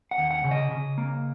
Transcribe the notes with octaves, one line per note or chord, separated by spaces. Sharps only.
F#5
D#2
F#5
C#3
D#5
C#3
A#3